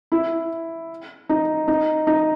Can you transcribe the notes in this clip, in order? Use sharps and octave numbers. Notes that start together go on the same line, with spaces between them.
E4
D#4
D#4
D#4